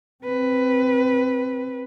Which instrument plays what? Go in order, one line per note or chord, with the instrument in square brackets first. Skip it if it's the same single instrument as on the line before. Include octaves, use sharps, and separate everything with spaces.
[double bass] C4 [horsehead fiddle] B4